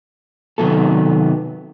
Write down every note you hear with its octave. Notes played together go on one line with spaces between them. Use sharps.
C3 D#3 F#3 B3 A4